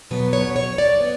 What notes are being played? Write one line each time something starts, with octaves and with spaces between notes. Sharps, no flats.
B2 F#3 B3 B4
C#5
C#5
D5
B3